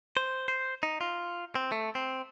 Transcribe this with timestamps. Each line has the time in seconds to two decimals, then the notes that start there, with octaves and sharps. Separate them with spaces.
0.17 C5
0.48 C5
0.83 D#4
1.01 F4
1.55 C4
1.72 A3
1.95 C4